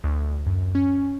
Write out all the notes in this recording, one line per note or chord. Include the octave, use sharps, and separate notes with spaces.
D2
F#2
C#4